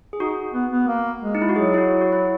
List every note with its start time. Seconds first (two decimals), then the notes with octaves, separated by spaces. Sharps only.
0.13 G#4
0.19 D#4 F#4
0.53 B3
0.71 B3
0.87 A#3
1.22 G#3
1.35 D#4
1.42 E4
1.49 F#4
1.56 F#3 G#4
1.74 E4
1.78 F#4
2.01 F#4
2.13 E4